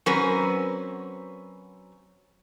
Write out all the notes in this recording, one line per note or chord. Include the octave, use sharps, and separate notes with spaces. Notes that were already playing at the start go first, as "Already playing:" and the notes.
F#3 C4 C#4 A#4 B4